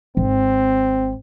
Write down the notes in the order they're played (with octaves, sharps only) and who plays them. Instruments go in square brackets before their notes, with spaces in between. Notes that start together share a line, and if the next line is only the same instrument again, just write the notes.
[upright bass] G#1 [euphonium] C4